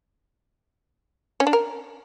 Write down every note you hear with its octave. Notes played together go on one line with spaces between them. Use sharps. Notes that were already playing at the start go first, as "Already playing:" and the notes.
C#4
D4
A#4